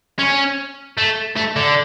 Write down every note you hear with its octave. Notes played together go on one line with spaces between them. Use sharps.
C#4
A3
A3
D3